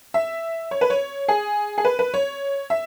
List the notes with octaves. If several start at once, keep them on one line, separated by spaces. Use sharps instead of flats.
E5
C#5
B4
C#5
G#4
G#4
B4
B4
C#5
E5